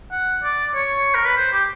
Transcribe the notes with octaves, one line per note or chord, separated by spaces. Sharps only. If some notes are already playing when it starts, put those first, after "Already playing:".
F#5
D5
C#5
A#4
B4
C5
G4